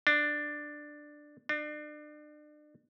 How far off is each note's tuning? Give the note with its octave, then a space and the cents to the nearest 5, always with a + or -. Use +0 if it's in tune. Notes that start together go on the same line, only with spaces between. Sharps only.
D4 +10
D4 +35